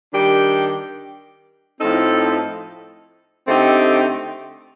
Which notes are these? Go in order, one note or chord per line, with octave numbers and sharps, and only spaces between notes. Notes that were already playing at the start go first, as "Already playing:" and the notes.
D#3 G3 D4 G4
A2 F3 C4 D#4 A4
D3 A3 C4 D#4 G4